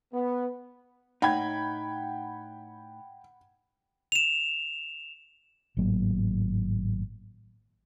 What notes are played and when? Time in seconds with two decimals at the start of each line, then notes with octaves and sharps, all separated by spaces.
0.13 B3
1.22 A2 D#4 F#5 G5 B5 G#6
4.12 E7 F7
5.77 G#1 A2 F#3 A#3